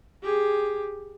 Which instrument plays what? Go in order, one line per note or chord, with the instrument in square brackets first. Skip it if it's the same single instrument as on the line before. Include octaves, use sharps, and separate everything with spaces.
[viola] G4 G#4